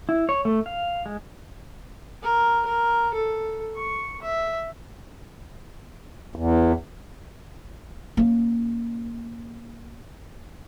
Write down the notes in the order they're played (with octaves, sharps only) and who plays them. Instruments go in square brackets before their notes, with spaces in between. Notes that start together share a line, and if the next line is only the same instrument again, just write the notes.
[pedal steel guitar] E4
C#5
A3
F5
G#3
[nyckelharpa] A#4
A#4
A4
C#6
E5
[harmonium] E2
[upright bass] A#3 C#4